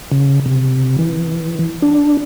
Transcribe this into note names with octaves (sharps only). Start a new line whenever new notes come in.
C#3
C3
E3
D4